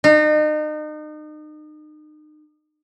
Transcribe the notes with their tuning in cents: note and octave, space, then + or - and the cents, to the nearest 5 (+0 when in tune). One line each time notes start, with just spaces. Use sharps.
D#4 -35